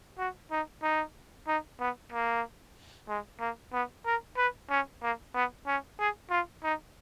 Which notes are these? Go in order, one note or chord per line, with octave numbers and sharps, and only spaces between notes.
F#4
D#4
D#4
D#4
B3
A#3
G#3
A#3
B3
A#4
B4
C#4
A#3
B3
C#4
G#4
F4
D#4